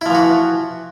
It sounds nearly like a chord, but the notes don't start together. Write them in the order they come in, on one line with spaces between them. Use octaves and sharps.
E4 F3 E3 F#4